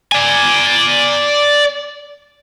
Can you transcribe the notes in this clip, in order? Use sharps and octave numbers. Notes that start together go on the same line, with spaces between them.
D5 G#5